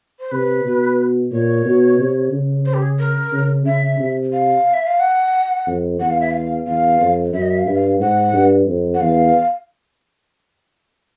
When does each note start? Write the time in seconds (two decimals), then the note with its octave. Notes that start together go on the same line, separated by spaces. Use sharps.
0.19 C5
0.31 C3 B4
0.65 B2
1.32 A#2 C#5
1.65 B2
1.99 C3
2.32 C#3
2.65 C5
2.74 G4
2.82 G#4
2.99 A#4
3.32 C#3
3.65 C#3 E5
3.99 C3
4.33 F5
4.73 E5
4.86 F5
5.00 F#5
5.67 F2
6.00 E2 F#5
6.10 F5
6.21 E5
6.31 F5
6.67 E2 F5
7.00 F2
7.33 F#2 E5
7.42 D#5
7.50 E5
7.59 F5
7.67 G2 E5
7.75 F5
8.00 G#2 F#5
8.33 G2
8.67 F2
8.94 F#5
9.01 E2 F5